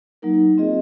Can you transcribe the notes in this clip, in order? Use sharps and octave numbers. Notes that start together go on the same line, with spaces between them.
F#3 A#3 D#4 A#4
C4 F4 G#4 D#5